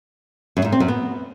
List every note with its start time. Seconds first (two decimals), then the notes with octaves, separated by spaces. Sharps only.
0.57 F#2
0.65 G#2
0.72 C4
0.80 F#2
0.88 B3